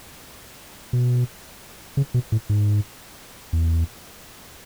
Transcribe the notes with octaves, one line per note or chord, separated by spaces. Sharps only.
B2
C#3
B2
A2
G#2
E2